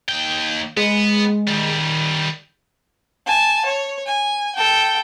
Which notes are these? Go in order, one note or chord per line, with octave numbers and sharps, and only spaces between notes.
D#2 G5
G#3 B3
D#3 G3
G#5 A5
C#5
G#5
A4 G5